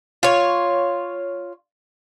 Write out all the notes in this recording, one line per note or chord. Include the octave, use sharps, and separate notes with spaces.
F4 C#5